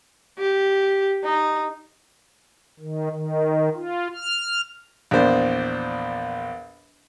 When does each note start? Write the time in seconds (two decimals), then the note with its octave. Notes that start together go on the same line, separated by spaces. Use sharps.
0.39 G4
1.25 D#4
2.80 D#3
3.11 D#3
3.75 F4
4.15 F6
5.11 A#1 E2 C5 D5